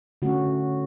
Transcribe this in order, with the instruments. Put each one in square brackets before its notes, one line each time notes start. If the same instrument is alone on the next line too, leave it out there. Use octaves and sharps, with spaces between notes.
[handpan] D3 A3 C#4 F#4